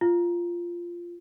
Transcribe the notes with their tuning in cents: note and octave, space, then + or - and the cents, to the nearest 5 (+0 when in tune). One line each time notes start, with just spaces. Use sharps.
F4 -10